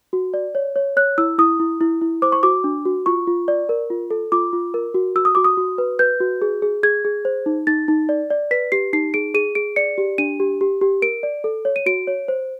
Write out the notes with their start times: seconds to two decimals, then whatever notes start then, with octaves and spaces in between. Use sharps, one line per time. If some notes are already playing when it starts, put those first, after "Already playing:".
0.13 F#4
0.34 D5
0.55 C#5
0.76 C#5
0.97 C#5 F#6
1.18 E4 E6
1.38 E4 D#6
1.60 E4
1.81 E4
2.01 E4
2.22 C5 D6
2.32 C#6
2.43 F#4 D6
2.64 D4
2.85 F#4
3.06 F4 C#6
3.27 F4
3.48 D5
3.69 A#4
3.90 F4
4.11 A4
4.32 F4 D6
4.53 F4
4.74 A#4
4.94 F#4
5.16 F#4 E6
5.25 D#6
5.35 F#4 D6
5.44 D#6
5.57 F#4
5.78 B4
5.99 B4 G6
6.20 F#4
6.42 G#4
6.62 G#4
6.83 G#4 G#6
7.05 G#4
7.25 C5
7.46 D#4
7.67 D#4 A6
7.88 D#4
8.09 D5
8.30 D5
8.51 B4 B6
8.72 G4 C7
8.93 D#4 C7
9.14 G#4 D7
9.34 G#4 D#7
9.55 G#4 D7
9.76 D5 C#7
9.98 G4
10.18 D4 D#7
10.40 G4
10.61 G4
10.81 G4
11.02 A#4 D7
11.23 D5
11.44 A4
11.65 C#5
11.76 D#7
11.86 F#4 D7
12.07 C#5
12.28 C5